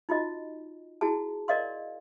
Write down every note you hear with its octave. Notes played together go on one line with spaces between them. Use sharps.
D#4 F4 F#4 D#5
E4 F#4 G#4 A5
A#4 D5 D#5 F5 C6